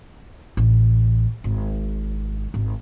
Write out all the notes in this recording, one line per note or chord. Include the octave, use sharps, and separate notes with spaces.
A1
G#1
G#1